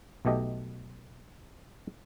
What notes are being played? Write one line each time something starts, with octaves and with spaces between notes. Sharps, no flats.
B1 B2 A3 G4 D#5